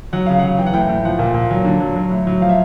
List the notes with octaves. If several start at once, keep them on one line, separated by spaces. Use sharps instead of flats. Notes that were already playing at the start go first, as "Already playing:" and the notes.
F#3 F#5
C#3 F5
F#3 F#5
E3 G5
F#5
A2 G5
A2
F3 F#5
A#2
A#2
F#3
D3
F#3
F#3
A2
F#3
F3 F5
E5